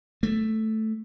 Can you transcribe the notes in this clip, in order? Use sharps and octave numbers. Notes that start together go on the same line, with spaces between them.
A3